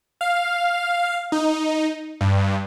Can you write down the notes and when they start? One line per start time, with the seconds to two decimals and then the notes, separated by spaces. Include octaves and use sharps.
0.21 F5
1.32 D#4
2.21 G2